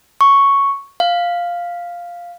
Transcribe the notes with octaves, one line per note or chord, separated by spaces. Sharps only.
C#6
F5